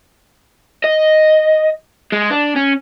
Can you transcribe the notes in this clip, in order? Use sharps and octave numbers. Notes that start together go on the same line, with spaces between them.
D#5
G#3
D4
C#4